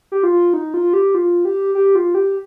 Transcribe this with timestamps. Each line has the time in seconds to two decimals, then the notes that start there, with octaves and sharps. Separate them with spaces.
0.12 G4
0.23 F4
0.54 D#4
0.74 F4
0.94 G4
1.15 F4
1.45 G4
1.75 G4
1.95 F4
2.15 G4